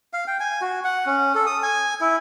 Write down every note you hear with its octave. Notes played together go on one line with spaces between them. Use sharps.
F5
G5
G#5
F#4
F#5
C#4
A4
D#6
G#5
E4